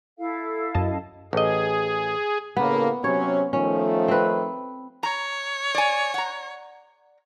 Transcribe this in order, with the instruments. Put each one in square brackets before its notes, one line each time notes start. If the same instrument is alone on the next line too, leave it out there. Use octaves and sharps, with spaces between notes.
[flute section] E4 A4 F5
[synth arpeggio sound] F#2 D#5 A5
[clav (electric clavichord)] A1 D#5 [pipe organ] G#4
[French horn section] A2 C#3 A#3 [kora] B3
[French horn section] C3 F#3 C#4 [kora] C#5
[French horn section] D#3 F3 A3 [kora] C#4
[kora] C4 B4
[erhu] C#5 [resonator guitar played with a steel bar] A#5
[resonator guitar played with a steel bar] D5 G#5
F#5 A#5